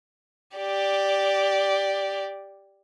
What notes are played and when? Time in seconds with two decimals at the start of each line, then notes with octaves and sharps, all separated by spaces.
0.57 G4 D5